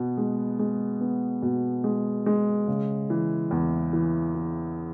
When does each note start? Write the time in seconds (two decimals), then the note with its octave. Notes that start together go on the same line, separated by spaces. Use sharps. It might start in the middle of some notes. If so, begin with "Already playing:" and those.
Already playing: B2 B3
0.17 G#3
0.59 G#3
1.01 B3
1.42 B2
1.84 G#3
2.26 G#3
2.68 C#3
3.10 E3
3.51 E2
3.93 E3
4.35 E3